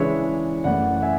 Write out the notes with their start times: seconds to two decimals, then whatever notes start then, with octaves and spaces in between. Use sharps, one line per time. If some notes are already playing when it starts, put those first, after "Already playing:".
Already playing: C#3 E3 G#3 D4 C#5 E5
0.64 F#2 E3 A3 D5 F#5
0.95 F#5
1.02 E5 G#5